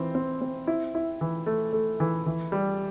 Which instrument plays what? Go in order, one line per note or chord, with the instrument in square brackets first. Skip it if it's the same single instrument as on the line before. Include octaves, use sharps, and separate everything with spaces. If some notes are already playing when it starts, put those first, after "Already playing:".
Already playing: [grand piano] E3 C4
C4
C4
E4
E4
E3
A3
A3
E3
E3
G3